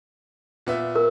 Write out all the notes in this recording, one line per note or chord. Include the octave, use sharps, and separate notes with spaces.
A#2 B3 E5
A#4